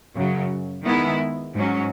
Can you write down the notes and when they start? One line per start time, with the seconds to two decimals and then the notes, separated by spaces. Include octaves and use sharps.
0.16 F#2 C#3 F#3
0.84 D#3 G#3 B3 E4
1.54 G#2 F#3 C#4